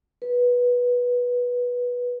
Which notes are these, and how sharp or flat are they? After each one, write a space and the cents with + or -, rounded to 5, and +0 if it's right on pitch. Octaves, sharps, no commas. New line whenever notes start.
B4 -15